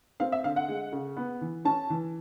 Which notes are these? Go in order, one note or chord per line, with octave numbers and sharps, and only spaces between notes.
C4 F5
E5
D3 F5
F#5
G#3
C#3
B3
E3
C#4 A5
E3